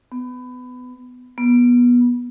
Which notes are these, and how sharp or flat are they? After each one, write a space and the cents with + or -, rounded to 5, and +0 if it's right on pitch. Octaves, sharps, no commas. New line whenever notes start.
B3 +25
B3 -20